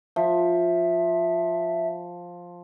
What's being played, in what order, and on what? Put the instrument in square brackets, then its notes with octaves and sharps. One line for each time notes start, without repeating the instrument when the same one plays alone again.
[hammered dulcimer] F3 [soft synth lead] E5